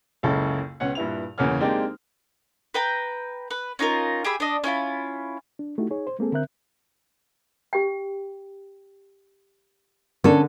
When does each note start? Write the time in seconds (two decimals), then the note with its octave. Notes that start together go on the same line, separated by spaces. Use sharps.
0.23 F#1 C#2 F#2 C#3 E4 A4
0.80 C#2 B3 C#4 F#5
0.95 G2 A#2 E4 B4 F7
1.38 G1 E2 C#3 A#3 C#4 F6
1.60 G#3 A#3 C4 D4 D#4 G4
2.74 B4 G5 A#5
3.50 B4
3.79 C#4 D#4 F4 A#4
4.24 G4 G#4 E5 B5
4.40 D4 D#5
4.64 C#4 E4 F4 B5
5.59 D4
5.78 A3 D#4 E4 F#4 G4
5.91 D#4 G#4 C#5
6.07 C5
6.19 G#3 A#3 C4 G#4 A4
6.32 D3 C4 A#4 E5 F#6 G6
7.73 G4 G5
10.24 D3 C#4 A4 A#4